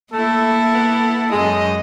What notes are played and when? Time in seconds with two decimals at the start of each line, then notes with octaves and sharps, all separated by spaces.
0.13 A3 A#3 E4 A4
0.74 B3
1.32 F#2 G#3 D#5